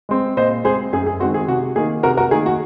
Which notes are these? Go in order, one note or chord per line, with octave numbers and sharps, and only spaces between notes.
G#3 C4
A#2 C5 D#5
G#3 C4 G#4 C5
F#2 G#4
G#4
D#3 G#3 C4 F#4
G#4
C3 F#4
D#3 A#3 G#4
C3 F#4 A#4
F#4 A#4
D#3 A#3 G#4
F#4